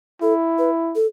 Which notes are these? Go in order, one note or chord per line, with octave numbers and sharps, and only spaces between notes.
E4 A4
B4
A4